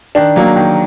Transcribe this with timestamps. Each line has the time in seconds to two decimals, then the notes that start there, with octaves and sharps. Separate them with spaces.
0.15 D#3 D4
0.36 F#3 A#3 D4
0.56 D#3